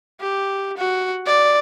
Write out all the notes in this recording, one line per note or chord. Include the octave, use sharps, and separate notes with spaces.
G4
F#4
D5